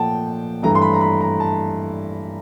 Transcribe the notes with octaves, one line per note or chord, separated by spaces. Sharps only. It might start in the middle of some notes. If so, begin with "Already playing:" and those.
Already playing: A#2 F3 A3 F#5 G5 A5
G2 E3 A3 A#5
C6
B5
A#5
B5
A#5
A5